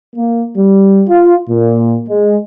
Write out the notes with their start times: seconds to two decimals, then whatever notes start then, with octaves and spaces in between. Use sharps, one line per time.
0.16 A#3
0.56 G3
1.08 F4
1.49 A#2
2.08 G#3